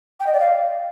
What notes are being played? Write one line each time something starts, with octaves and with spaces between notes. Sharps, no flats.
G5
D#5
D5
F5